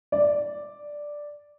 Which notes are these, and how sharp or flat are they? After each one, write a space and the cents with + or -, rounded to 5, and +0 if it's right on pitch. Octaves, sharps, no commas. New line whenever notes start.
D5 +0